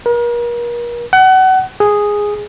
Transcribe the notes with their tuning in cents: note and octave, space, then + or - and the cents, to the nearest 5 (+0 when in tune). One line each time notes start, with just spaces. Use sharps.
A#4 +40
F#5 +30
G#4 -5